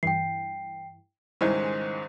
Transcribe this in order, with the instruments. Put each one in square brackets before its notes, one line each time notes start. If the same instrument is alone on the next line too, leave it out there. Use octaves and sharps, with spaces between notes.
[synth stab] G2 E3 [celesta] G5 C7
[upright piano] C#2 G#2 D#3 [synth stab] G3 E4 G#5 [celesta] C5